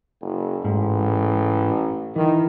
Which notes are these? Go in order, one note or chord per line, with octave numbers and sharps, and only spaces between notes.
F#1
A1 G#2
D#3 E3